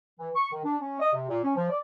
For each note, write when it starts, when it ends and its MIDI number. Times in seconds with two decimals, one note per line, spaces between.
0.19 0.30 52
0.35 0.49 85
0.52 0.64 51
0.65 0.76 62
0.81 0.96 61
1.00 1.12 75
1.13 1.27 48
1.29 1.42 46
1.44 1.54 61
1.56 1.69 53
1.70 1.78 74